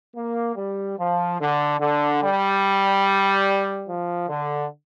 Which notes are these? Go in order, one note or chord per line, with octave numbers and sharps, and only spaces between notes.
A#3
G3
F3
D3
D3
G3
F3
D3